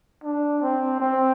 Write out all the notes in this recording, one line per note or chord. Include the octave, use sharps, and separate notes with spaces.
D4
C4
C4